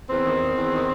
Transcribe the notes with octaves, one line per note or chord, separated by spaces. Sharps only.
E2 C4
D#3
E2
E2
D#3